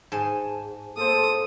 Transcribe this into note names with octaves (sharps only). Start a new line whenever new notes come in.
G#2 G#5 A5
A#3 A4 C5 D#6